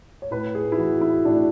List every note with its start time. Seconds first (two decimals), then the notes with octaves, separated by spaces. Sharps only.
0.22 C#5
0.31 A2 B4
0.55 G#4
0.72 E4
0.78 E3 F#4
1.01 E4
1.25 A2 D4